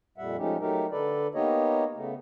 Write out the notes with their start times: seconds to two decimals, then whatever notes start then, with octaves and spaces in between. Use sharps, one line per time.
0.18 F2 A#2 G3 E5 F#5
0.38 F3 G#3 A3 C#4 D#4 G4
0.60 F#3 A3 D#4 G4 A#4
0.91 D3 A4 B4 D5
1.35 A#3 B3 D#4 G4 C#5 D#5
1.96 C#3 A3 B3